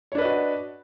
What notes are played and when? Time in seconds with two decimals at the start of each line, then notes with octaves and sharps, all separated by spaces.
0.12 C#5
0.15 D4
0.18 B4
0.21 D#5
0.25 F#4